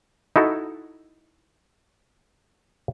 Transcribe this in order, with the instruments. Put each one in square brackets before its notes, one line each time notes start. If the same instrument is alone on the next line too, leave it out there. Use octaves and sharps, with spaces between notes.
[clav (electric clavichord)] D#4 E4 F#4 A4